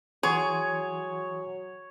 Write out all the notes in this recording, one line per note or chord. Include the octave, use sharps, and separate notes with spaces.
E3 F#3 G#4 C#5 F#5 C6